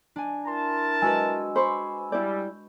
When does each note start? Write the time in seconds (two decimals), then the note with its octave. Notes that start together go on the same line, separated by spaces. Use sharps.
0.16 D4 G#5
0.47 E4 A#4 A5 C6
1.02 G#3 F#4 B4 G#5 E6
1.56 C5 B5 C#6 D6
2.12 G3 E4 D5 G6